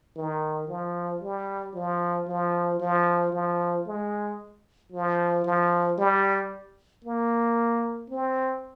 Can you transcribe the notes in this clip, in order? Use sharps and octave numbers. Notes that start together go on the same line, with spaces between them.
D#3
F3
G3
F3
F3
F3
F3
G#3
F3
F3
G3
A#3
C4